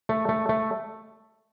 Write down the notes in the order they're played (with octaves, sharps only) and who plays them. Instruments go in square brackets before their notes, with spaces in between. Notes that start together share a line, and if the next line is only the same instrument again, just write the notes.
[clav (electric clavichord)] A3
A3
A3